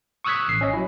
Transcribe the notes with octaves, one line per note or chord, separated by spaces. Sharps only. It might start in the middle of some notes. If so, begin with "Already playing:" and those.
C#6 D#6 E6 F#6 G#6 B6
A1 C7
C#4 D#5
F#3 E4